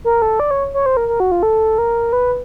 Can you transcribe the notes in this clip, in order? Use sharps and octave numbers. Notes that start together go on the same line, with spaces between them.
A#4
A4
D5
C#5
C#5
C5
A#4
A#4
F#4
F4
A4
A#4
B4